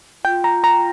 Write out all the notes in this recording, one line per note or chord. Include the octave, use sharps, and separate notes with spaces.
F4 G5
A#5
A#5